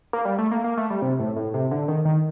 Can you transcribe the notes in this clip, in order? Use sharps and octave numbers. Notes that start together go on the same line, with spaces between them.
A#3
G3
A3
A#3
A#3
A3
G3
C3
A2
A2
C3
D3
D#3
D#3